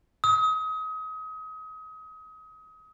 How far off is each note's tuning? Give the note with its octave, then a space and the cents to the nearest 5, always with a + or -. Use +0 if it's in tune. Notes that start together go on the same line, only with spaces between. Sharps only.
D#6 +30